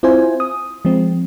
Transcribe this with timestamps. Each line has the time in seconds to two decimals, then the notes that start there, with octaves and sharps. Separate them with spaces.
0.03 C4 E4 F4 C5 G#5
0.40 D#6
0.85 F3 G#3 C4